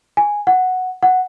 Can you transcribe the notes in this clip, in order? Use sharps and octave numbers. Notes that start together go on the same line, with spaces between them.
G#5
F#5
F#5